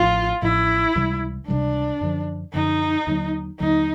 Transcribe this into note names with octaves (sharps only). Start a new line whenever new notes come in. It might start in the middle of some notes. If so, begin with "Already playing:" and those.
Already playing: A1 A2 F3 F4
A1 A2 F3 E4
C#2 C3 E3 G3
C#2 C3 E3 G3 D4
F#2 D3 F3
F#2 D3 F3 D#4
D#2 D3 F#3
D#2 D3 F#3 D#4